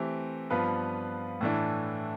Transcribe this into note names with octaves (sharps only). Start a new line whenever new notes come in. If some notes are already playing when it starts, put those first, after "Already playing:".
Already playing: E3 A3 C4 G4
G2 F3 B3 F4 B4
A2 E3 A3 D4